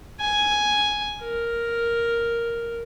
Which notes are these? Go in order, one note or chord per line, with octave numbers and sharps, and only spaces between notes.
G#5
A#4